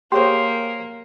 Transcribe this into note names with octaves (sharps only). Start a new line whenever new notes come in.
A#3 G4 G#4 C5 C#5 C6